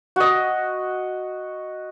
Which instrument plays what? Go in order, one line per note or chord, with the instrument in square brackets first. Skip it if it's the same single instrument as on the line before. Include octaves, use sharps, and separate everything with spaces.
[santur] F#4 D#5